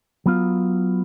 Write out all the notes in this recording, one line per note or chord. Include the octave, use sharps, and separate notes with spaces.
F#3 B3 F4